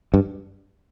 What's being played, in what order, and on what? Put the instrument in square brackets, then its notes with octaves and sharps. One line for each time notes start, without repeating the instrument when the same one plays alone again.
[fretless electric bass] G2